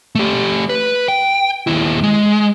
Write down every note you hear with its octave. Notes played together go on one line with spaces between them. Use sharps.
A3 G4
B4
G5
D#2 E4
G#3